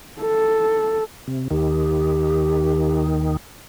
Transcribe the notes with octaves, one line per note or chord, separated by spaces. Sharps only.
A4
C3
D#2 D#3 G4